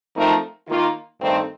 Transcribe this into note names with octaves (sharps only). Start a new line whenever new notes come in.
F3 A3 C4 D#4 A#4
D#3 A#3 F4
G2 D#3 A3 C4